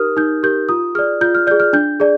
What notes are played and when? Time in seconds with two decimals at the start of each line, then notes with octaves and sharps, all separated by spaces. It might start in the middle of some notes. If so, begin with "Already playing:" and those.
Already playing: D#4 G4 A#4 D#6 F6
0.17 D#4 G6
0.43 G4 A#4 G6
0.69 F4 D#6
0.95 G#4 D5 F6
1.21 F4 G6
1.35 F6
1.47 G#4 D5 G6
1.60 F6
1.73 D4 G6
2.00 G#4 D5